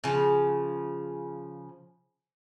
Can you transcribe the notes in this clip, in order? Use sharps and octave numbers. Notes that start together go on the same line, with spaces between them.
C#3 F3